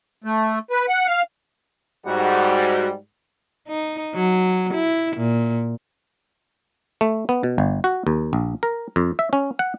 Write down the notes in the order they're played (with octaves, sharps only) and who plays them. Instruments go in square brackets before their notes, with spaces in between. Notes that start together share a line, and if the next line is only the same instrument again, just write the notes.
[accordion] A3
B4
F#5
F5
[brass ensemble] G#2 G3 [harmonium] F#4 F#5
[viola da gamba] D#4
F#3
E4
A#2
[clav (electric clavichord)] A3
B3
B2
G1
F#4
D#2
A#1
A#4
F2
E5
C#4
F#5